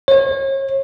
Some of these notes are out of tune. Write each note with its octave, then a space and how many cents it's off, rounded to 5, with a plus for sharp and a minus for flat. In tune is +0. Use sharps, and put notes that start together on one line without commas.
C#5 -35